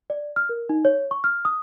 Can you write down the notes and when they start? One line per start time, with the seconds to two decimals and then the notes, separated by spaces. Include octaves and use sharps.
0.10 D5
0.36 F6
0.49 A#4
0.69 D#4
0.85 C#5
1.11 C#6
1.24 F6
1.45 D#6